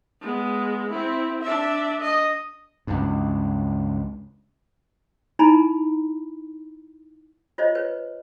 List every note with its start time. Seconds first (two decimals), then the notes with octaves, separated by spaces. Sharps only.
0.21 G#3 B3
0.90 C4 E4
1.42 D4 E5
2.01 D#5
2.87 C#2 G2
5.39 D#4 E4 G#5 A#5 B5
7.58 F4 C5 C#5 D#5
7.75 B4 C#5